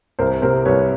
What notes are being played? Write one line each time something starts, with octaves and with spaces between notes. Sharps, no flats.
C2 A#4 C5
C3 A#4 C5
C2 B4 C#5